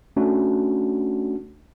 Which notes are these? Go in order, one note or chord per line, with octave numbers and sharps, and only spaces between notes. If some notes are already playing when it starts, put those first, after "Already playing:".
A3 C#4 D4 F#4